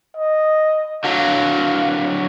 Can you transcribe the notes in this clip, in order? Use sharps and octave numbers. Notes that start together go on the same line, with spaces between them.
D#5
D3 F#3 F5